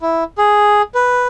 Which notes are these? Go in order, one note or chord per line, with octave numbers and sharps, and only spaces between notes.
E4
G#4
B4